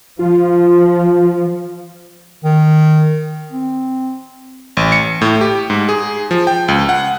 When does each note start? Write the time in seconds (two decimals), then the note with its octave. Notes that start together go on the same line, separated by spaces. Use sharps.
0.19 F3 F4
2.44 D#3
3.52 C4
4.77 A1
4.92 C#7
5.21 A2
5.41 G4
5.70 G#2
5.89 G#4
6.31 F3
6.47 G5
6.68 C#2
6.89 F#5